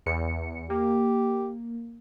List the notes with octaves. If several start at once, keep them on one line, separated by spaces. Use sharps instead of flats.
E2 C#7
A#3 G4